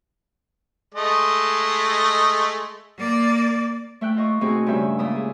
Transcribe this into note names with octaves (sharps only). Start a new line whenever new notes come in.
G#3 A3 D#5
A#3 D5
A3 E5 G5 F#6
F4 D#5 C#6
B2 A3 C4 D#4 F#4 G#4
G2 C#3 C#4 C#5 E5 G6
A#2 G#3 E5 D#6
G#4